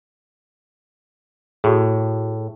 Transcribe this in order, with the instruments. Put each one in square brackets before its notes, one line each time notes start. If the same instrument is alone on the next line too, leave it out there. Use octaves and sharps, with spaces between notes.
[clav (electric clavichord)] A2 [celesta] F#4 G#4